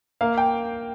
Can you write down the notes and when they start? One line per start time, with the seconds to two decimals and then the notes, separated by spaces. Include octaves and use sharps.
0.21 A#3 F5
0.38 G5